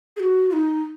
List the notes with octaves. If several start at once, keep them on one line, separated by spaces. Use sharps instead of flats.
G#4
F#4
F4
D#4